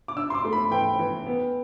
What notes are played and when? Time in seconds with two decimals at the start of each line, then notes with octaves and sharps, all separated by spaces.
0.08 D6
0.17 D4 E6
0.30 C6
0.35 D6
0.44 A3
0.53 B5
0.71 E3 G5
0.99 E3
1.26 B3